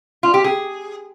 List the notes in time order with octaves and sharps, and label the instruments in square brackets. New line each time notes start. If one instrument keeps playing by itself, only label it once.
[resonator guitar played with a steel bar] F4
G4
G#4